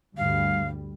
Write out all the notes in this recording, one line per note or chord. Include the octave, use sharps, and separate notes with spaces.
D2 G2 G3 F5